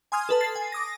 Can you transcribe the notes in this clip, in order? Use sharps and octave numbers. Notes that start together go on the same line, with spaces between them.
G#5 C6 D#6 F6 G#6
A4 B4 A5
A6 C7
G#5
D6 D#6 A#6